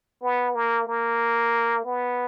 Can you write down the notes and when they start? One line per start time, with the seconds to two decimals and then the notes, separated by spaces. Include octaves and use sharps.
0.22 B3
0.55 A#3
0.87 A#3
1.85 B3